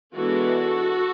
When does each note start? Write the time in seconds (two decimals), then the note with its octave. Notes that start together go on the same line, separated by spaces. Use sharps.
0.15 E3 G#3 B3 D4 F#4 A4